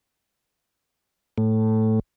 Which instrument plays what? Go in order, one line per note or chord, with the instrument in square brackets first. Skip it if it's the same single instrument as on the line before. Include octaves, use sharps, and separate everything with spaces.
[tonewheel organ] A2 A3